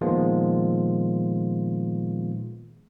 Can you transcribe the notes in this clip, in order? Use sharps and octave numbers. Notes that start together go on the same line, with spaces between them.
A#2 D#3 F3 G#3 B3 F4